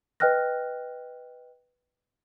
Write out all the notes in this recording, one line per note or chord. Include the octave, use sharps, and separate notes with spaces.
B4 D#5 G5 F6 F#6 A#6